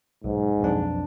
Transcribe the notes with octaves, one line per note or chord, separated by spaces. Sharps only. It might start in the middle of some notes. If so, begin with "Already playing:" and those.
B1 G#2
B1 F2 D4